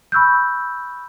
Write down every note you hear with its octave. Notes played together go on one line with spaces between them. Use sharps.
B5 C#6 E6 F#6 G6